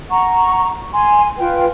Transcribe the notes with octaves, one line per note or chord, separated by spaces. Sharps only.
F#5 A#5 C#6
G#5 C6
F4 B4 G5